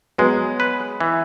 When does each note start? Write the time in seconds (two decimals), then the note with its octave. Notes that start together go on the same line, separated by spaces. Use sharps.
0.18 F#3 G#3 B3
0.60 B4
1.01 E3